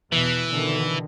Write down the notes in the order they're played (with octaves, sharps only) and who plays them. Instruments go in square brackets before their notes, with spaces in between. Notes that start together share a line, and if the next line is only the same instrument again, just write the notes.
[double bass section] E2 B2 [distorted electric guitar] E3
[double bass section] B2 D3 D#3